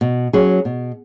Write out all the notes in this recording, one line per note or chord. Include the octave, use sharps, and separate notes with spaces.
B2
F#3 C#4 G#4
B2